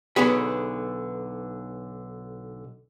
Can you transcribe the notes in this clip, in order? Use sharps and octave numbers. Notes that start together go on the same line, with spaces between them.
B1 D3 B3 F#4 G#4 B5